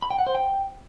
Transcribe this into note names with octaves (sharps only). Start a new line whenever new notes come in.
B5
G5
F#5
C5
G5